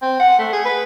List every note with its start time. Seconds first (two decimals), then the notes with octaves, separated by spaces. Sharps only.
0.02 C4
0.20 F#5
0.39 A3
0.53 G#4
0.65 B4